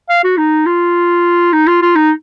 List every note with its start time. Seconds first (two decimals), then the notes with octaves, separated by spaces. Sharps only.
0.09 F5
0.24 F#4
0.37 D#4
0.66 F4
1.53 D#4
1.67 F4
1.82 F4
1.96 D#4